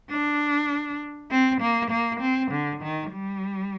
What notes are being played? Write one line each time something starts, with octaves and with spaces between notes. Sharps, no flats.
D4
C4
A#3
A#3
C4
D3
D#3
G3